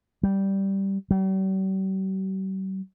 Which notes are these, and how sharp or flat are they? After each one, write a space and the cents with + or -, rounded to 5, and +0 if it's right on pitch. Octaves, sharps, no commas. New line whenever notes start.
G3 -5
G3 -45